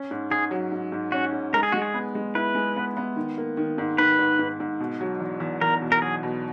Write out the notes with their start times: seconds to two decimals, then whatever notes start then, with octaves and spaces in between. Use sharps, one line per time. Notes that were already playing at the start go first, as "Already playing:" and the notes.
Already playing: C#4
0.11 G#2
0.31 G#2 G#4
0.51 F#3
0.72 G#2
0.92 G#2
1.12 C#4 F#4
1.32 G#2
1.53 G#3 A#4
1.63 G#4
1.72 G#3 F#4
1.82 G#4
1.94 B3
2.15 G#3
2.35 E4 B4
2.55 G#3
2.76 B3
2.97 B3
3.16 D#3
3.38 A#3
3.57 D#3
3.78 G#2
3.98 D#3 B4
4.19 G#2
4.39 G#2
4.60 G#2
4.80 B2
5.01 F#3
5.20 E2
5.40 E2
5.61 E2 A#4
5.82 B2
5.92 A#4
6.02 F#3 G#4
6.23 B2